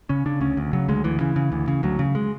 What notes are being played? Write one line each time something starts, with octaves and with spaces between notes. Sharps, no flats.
C#3 C#4
C#3 D4
D2 C#4
D2
C#3 F#3
D2 G#3
D2 E3
C#3 E3
C#3
D2
C#3
D2 F#3
C#3
G#3